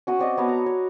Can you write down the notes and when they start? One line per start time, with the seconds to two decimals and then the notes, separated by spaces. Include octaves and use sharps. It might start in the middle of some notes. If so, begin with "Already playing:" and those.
0.07 C#4 F#4 D#6
0.19 C4 D5 D#5
0.37 B3 C#5 A5
0.49 A#5
0.66 C#5